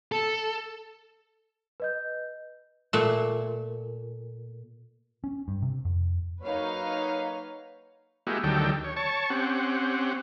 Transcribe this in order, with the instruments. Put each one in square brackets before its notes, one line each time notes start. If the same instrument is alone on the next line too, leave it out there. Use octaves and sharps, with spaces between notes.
[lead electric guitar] A4
[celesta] B4 D#5 G6
[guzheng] A#2 A3
[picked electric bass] C#4
G2
C3
F2
[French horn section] F#3 A#3 C#5 [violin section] D#4 B4 F5
[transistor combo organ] G#3 A#3 E4 F#4 G4
D2 D#3 F#3 G3 A4 G5
C#5
C#5 A5 C#6
C4 C#4 G4 F#5